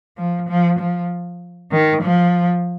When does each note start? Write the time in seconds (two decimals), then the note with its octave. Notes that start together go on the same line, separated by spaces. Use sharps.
0.18 F3
0.48 F3
0.79 F3
1.71 D#3
2.02 F3